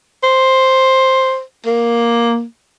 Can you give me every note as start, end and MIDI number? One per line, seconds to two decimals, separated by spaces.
0.23 1.42 72
1.66 2.43 58